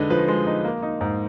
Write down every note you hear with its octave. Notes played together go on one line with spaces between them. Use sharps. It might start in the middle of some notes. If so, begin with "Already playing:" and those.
Already playing: D3 G#3 D#4 B4
F3 B4
G#3
D#4
A#3
D#4
G#2